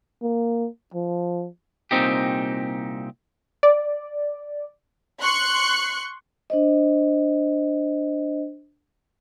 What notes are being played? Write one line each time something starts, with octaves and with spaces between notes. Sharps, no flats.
A#3
F3
C2 A#2 A#3 C4 D#4 G4
D5
C6 C#6 F#6 C#7
D4 C5 D#5